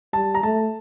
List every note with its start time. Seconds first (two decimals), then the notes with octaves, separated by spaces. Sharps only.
0.13 G3 A5
0.35 A#5
0.43 A3 A5